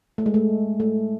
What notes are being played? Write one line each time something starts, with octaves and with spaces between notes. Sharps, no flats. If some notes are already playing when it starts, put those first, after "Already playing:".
A3
G#3
A3
A3